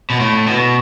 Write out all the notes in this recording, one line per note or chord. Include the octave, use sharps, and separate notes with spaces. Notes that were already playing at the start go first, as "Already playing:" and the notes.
B2
A2
B2